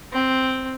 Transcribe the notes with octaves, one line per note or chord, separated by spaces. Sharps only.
C4